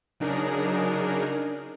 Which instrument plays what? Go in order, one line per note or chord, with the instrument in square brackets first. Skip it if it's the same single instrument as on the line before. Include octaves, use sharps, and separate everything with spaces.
[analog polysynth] C#3 F#3 D4 D#4 G#4 A#4